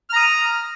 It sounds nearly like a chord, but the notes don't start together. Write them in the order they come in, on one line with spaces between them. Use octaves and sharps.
F6 A#5 D#6